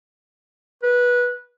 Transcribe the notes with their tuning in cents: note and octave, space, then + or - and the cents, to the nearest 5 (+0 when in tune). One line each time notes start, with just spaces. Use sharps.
B4 -15